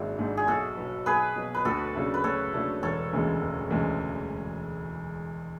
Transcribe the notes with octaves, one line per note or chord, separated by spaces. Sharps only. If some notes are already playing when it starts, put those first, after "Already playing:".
Already playing: G#1 G#2 G#3 D4 E4 F#4
G#2 G#3 D4
G#4
B1 F#4 A4
B2 F#3 B3
B1 G#4 B4
B2 F#3 B3
B4
D2 F#4 A4
C#3 F#3 A3 D4
B4
D2 A4 C#5
C#3 F#3 A3 D4
E1 A4 C#5
D2 C#3 E3 G#3
E1
D2 C#3 E3 G#3